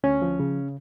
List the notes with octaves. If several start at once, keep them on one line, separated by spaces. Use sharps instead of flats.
D2 C#4
F3
C#3